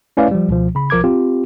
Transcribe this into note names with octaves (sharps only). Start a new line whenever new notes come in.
A3 C#4 E4 B4 D5 F5
F3 G3
C#2 B2 F3
C#3 B5
B1 F3 A#4 D6 G#6
C4 F4 G4